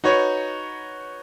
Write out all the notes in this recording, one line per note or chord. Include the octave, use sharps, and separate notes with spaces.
D#4 F#4 B4 C#5